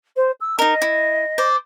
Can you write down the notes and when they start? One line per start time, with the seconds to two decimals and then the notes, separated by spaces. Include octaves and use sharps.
0.16 C5
0.40 E6
0.59 D#4 A#4 D#5
0.82 E4
1.38 C5 D5